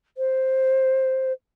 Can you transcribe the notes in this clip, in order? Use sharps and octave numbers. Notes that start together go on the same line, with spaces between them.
C5